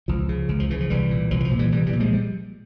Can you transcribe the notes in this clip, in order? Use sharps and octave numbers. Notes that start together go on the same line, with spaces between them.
C#2 F3
C#3
C#2
F3
C#3 E3
F3
C2 E3 G3
A#2
C2 F3
E3
F3
A#2
E3 G3
C2 E3 G3
E3 G3
A#2
F3 G#3
G3